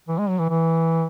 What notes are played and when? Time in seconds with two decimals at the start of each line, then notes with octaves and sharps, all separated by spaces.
0.08 E3
0.18 G#3
0.29 F#3
0.39 E3
0.49 E3